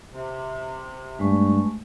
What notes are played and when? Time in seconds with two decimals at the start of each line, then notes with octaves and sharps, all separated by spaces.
0.11 C3
1.19 G2 G#3 A3 C#6